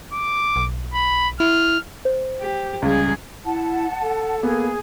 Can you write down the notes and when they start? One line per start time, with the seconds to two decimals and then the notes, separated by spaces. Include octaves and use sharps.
0.13 D6
0.56 B1
0.94 B5
1.40 E4 F6
2.05 C5
2.41 G4
2.82 C#2 G3 G#4
3.45 E4 F#5 A5
4.02 A4
4.43 A#3 B3 G#4